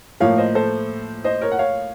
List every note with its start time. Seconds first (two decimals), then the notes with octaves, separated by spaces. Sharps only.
0.20 A2 F3 A#3 C#5 F5
0.38 C5 D#5
0.55 A4 C5
1.24 C5 D#5
1.41 A#4 C#5
1.52 F#5
1.59 C#5 F5